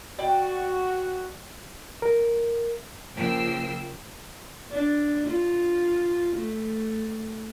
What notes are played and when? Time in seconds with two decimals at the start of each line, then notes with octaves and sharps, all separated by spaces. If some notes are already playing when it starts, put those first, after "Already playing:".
0.19 F#4 D5 G5
2.02 A#4
3.15 C#3 F3 A#3 G5 E6 C7
4.71 D4
5.27 F4
6.36 A3